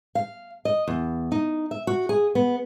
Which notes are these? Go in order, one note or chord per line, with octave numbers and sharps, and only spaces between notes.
F5
D#5
E2
D#4
E5
F#4
G#4
B3